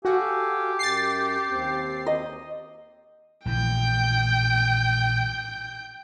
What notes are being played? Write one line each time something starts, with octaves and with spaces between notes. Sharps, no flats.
F#4 G4 A4 F5 G#5
F#2 A6 C7
D#2 C4
D#5
A#1 A2 E3 G5 G6